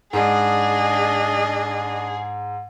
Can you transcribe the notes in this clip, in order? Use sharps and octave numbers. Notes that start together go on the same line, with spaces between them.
G#2 D4 G#4 D#5